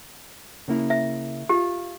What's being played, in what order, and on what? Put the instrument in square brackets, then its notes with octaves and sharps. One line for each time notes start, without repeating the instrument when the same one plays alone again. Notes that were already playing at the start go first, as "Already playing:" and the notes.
[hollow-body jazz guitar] C#3 A#3 E4
[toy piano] E5
[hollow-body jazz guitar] F4 [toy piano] G4